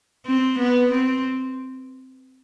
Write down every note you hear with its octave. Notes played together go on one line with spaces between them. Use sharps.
C4
B3
C4